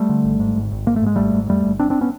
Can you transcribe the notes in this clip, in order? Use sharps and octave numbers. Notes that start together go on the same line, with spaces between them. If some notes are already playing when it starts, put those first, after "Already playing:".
Already playing: G3 A3
D3
G#1
G#2
G#1
G#1
G#2 A#3
A3
G#2 G#3
G#1 G3 A3
G#2
F2 G3 A3
G1
G1 C4 D4
C4 D4
B3 C#4